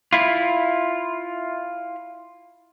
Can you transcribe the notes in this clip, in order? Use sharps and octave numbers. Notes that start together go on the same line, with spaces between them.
E4 F4